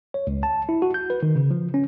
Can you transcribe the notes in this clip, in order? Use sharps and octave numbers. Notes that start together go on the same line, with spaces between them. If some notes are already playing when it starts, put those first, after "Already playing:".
C#5
C#2
A5
E4
F#4
G6
B4
D#3
C#3
F3
C#4